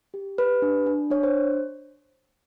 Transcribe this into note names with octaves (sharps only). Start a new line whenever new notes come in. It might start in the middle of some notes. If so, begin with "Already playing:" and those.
G4
G4 B4
D4
D4
D4 C#5
C5